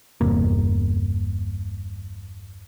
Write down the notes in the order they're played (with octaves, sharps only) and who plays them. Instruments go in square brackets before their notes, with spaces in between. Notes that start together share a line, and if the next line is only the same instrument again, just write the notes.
[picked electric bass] G1 E2 C3 A#3